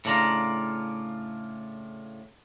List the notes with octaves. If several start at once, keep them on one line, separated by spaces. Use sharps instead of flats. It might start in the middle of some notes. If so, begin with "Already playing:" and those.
A2 C#3 D4 F4 A#5